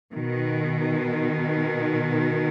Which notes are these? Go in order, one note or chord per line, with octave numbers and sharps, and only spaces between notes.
B2 D#3